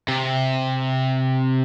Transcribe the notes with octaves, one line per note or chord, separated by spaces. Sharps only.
C3